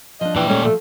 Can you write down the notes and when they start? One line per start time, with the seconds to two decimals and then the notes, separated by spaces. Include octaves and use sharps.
0.21 F3 D4 D#5
0.36 A#2 E3 D5 G5
0.49 G#3 A3 C#4 G4
0.64 F3 A3 A4